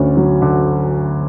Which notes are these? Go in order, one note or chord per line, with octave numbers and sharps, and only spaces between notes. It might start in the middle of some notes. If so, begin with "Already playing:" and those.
Already playing: D2 D3 C#4
F#3
D3